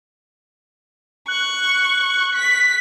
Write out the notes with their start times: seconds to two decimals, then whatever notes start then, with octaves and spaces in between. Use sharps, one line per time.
1.28 C#6 F#6
2.35 B6